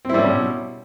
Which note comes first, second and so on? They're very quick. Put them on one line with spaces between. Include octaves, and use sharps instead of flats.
C4 E4 G3 C#4 B2